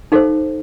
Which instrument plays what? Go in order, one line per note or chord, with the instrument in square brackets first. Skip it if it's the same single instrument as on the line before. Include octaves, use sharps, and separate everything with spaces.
[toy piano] D#4 A4 C5 F5